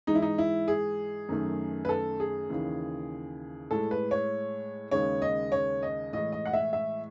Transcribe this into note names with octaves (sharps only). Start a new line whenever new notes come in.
G#2 E3 G#3 D#4
E4
D#4
E4
G#4
F#2 D#3 A3
B4
A4
G#4
D#2 C#3 E3
A2 G#3 A4
B4
C#5
D#2 C#3 G#3 C#5
D#5
C#5
D#5
A2 E3 G#3 D#5
D#5
F#5
E5
E5